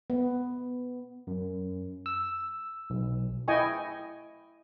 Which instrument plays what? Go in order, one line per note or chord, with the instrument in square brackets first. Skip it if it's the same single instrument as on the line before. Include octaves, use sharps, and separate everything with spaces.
[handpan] B3
[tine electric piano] F#2
E6
B1
[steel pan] E4 D#5 G5 G#5 C#6